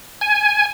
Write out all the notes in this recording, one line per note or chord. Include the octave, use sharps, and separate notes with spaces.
G#5